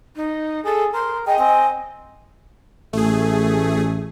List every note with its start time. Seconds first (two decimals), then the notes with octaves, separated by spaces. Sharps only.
0.16 D#4
0.65 G#4 A4
0.94 A#4 C6
1.27 G#4 D#5 G5
1.39 C4 G#5
2.93 A1 A3 G#4